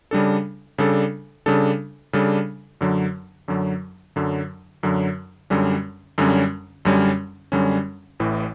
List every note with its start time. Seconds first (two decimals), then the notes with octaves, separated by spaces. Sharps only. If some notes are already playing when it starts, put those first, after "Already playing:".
0.11 C#3 G3 D4 A4
0.78 C#3 G3 D4 A4
1.46 C#3 G3 D4 A4
2.13 C#3 G3 D4 A4
2.81 F#2 D3 F#3
3.48 F#2 D3 F#3
4.16 F#2 D3 F#3
4.83 F#2 D3 F#3
5.50 F#2 D3 G3 C#4
6.18 F#2 D3 G3 C#4
6.85 F#2 D3 G3 C#4
7.52 F#2 D3 G3 C#4
8.20 A1 A2 E3